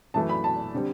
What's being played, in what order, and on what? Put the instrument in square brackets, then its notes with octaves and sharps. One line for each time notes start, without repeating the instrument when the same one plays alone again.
[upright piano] F#2 E3 A3 A5
B5
A5
D3 G3 C4